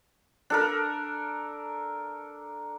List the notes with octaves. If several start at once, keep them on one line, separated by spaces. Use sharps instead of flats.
D4 A4 A#4